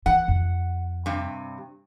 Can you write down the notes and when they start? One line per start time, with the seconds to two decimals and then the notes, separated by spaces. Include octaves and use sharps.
0.06 E3 F#5
0.28 F2
1.06 G2 C3